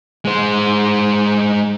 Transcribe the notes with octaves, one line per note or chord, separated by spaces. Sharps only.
G#3 C5